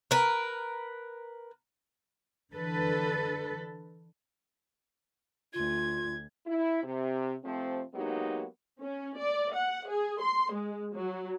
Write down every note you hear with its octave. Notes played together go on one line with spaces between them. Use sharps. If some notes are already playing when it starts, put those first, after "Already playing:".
A#4 B4
D3 E3 A4 B4
D2 F4 G#6
E4
C3
C3 F3 A3 C4
F#3 G#3 A#3 B3 D#4 G4
C#4
D5
F#5
G#4
C6
G#3
F#3